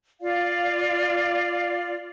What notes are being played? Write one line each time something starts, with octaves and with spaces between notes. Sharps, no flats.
F4 D5 F5